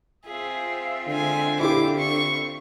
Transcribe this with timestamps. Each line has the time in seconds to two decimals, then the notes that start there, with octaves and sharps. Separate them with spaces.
0.25 C4 F4 G#4 E5
1.08 D3 G#3 G#5
1.60 E4 G4 D6
1.98 C#6